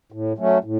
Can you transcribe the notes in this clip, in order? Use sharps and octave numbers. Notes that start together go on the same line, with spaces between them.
A2
F#3 A3 C#4
A2